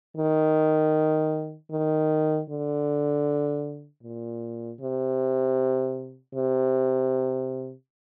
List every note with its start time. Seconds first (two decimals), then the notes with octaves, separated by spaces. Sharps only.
0.17 D#3
1.71 D#3
2.50 D3
4.03 A#2
4.81 C3
6.35 C3